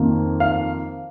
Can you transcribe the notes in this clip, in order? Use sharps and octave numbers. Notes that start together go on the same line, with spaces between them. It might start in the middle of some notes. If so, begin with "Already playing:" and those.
Already playing: F2 D#3 A#3
F5